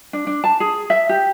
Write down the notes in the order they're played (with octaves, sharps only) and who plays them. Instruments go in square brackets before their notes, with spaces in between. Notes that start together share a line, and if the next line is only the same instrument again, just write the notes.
[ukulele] D4
D4
A5
G#4
E5
G4